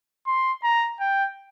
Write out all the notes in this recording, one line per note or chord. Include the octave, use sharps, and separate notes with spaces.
C6
A#5
G5